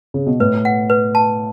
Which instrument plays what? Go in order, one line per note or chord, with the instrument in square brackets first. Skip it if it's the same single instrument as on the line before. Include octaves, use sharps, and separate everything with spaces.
[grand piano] C#3
B2
[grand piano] A2 [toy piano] B4
[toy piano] F#5
B4
A5